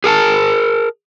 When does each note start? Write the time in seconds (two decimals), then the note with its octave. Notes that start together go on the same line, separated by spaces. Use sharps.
0.04 G#4 A#4 G#5 A5